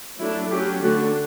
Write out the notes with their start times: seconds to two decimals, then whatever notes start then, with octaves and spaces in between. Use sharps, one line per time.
0.19 F#3 A3 D4 E4
0.51 F#3 C#4 G4
0.83 D3 A3 D4 F#4